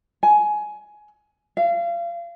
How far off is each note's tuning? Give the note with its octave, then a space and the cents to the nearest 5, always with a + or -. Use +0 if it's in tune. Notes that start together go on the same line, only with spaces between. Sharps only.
G#5 +15
F5 -30